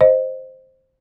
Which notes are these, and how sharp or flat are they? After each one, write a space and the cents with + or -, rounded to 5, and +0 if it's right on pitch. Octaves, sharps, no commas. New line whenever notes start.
C5 +0 D#5 +0